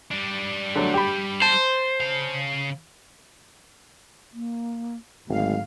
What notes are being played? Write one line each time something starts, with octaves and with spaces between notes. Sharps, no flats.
G3 D4
D3 F#3 A3
G4 B5
C5 A5
C#3 F5
A#3
G#1 D2 G#2 F#3 F5